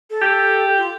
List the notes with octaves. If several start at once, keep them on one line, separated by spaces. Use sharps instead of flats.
A4
G4
F4